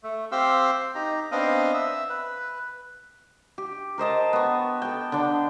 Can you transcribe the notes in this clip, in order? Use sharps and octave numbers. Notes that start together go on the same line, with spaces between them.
A3
C4 G4 F5 C6 E6
D#4 G4 A#5
B3 C4 D4 D#5 F5
E5
B4
G4
A#4 C5 D#5 A5
B3 C#6
A4 G5
D3 D4